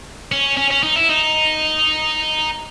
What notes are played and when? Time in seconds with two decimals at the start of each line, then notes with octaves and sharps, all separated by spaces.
0.32 C#4
0.57 C#4
0.71 C#4
0.83 D#4
0.96 E4
1.09 D#4